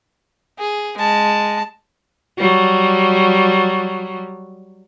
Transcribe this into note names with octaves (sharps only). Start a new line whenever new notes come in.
G#4
G#3 A5
F#3 G3